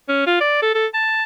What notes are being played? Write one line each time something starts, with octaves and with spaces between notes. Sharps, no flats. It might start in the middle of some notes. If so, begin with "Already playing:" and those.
C#4
F4
D5
A4
A4
A5